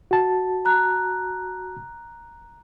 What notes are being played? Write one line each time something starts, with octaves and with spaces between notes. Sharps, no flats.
F#4 A5
A#5 F#6